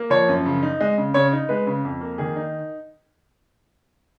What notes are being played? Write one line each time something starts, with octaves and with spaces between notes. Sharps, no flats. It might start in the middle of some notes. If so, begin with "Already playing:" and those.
Already playing: A#3
F3 C#5
F#2
C#3
D#4
G#3 D#5
C#3
C#3 C#5
D#4
G#3 B4
C#3
F2
A#3
D#3 G#4
D#4